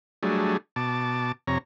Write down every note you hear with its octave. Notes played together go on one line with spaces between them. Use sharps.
F#3 G3 A3 D4 G#4
B2 A5 D6
F2 C3 C#5 A#5